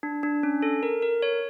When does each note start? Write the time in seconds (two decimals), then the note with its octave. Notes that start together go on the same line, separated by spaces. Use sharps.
0.03 D4
0.23 D4
0.43 C#4
0.62 A4
0.83 A#4
1.02 A#4
1.22 C#5